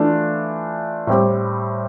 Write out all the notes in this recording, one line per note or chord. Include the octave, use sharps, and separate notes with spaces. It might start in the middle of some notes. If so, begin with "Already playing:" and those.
Already playing: E3 A3 D4 F4
A2 G3 C4 G4